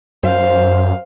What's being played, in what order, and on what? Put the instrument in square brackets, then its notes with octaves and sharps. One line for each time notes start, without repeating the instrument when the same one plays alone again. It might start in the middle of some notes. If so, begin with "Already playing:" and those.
[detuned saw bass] F#2 [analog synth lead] C5 [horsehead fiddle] F5